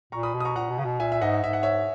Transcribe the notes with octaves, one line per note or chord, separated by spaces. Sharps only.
A#2 A#5 C#6
B5 D#6
B2
D#6
A#5 C#6
A#2 F#5 A#5
B2
C#3
B2
A#2 E5 G#5
E5
G#2 D#5 F#5
G#2 E5
F#5
C#5 E5